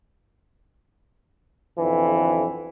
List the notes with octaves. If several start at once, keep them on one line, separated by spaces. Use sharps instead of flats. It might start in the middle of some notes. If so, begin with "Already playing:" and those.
B1 F2 D3 E3